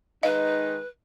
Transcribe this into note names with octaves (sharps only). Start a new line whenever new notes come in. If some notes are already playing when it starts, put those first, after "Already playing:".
D#3 G#3 D#4 B4 D#5 F5